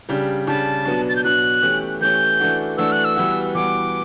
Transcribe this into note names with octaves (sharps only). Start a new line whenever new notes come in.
C#3 G3 D4 G4
C#3 G3 D4 G4 A5
B2 F#3 B3 D4
A6
G6
B2 F#3 B3 D4 F#6
E3 A3 C#4 G4
E3 A3 C#4 G4 G6
E3 A3 D4 F#4
E3 A3 D4 F#4 E6
F#6
E6
E3 G3 B3 F#4
E3 G3 B3 F#4 D6